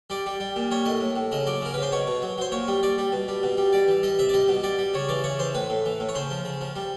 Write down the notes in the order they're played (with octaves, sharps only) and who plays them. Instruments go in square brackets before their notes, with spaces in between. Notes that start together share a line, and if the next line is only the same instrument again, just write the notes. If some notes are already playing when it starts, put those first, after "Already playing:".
[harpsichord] G3 D5
G3
G3
A#2
G3 C#5
A2 D#5
A2
A2
C#3 D#5
F#3 D5
C#3 A#4
C#3 B4
C5
B2 C#5
B2
F#3
F#3 C5
A#2 C#5
G3
G3 D5
G3
B2
G3
B2
G3
G3 D5
E3
G3 D#5
C3 E5
D5
G3 D#5
B2
G3 D5
G3
C#3 C#5
E3 D5
C#3 C#5
E3 C5
A2 B4
A2
E3
A2
C#5
C#3 C5
F3
C#3
F3
G3